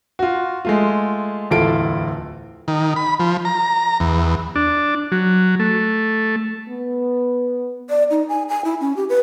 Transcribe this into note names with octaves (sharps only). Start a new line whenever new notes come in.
F4 F#4
G#3 A3 F4
D1 E2 E4 F4 A4 D7
D#3
B5
F3
A#5
E2
D4
F#3
A3
B3
D5
D#4
G#5
G#5
E4
C#4
G4
B4